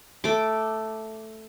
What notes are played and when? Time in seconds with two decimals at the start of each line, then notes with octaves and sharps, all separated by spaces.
0.24 A3 D6